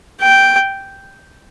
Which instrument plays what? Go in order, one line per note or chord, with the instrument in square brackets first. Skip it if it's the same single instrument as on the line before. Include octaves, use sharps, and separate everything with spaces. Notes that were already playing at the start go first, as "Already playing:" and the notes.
[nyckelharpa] G5